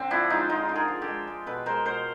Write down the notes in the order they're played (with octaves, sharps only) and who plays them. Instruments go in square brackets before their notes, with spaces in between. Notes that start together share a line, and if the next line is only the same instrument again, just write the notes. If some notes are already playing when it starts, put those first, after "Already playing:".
Already playing: [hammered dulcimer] D3 C4
F3 D4 E4
G#3 D#4 F4
D3 D#4 F4
D3
G#4 A#4
F3
G4 A4
G#3
G#3
B2 A4 B4
G#3 A#4 C5
B2 A#4 C5